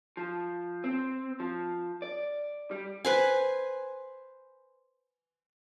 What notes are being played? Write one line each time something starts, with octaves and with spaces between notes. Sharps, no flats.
F3
C4
F3
D5
G3
B4 C5 G#5